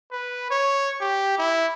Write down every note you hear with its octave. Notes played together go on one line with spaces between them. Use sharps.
B4
C#5
G4
E4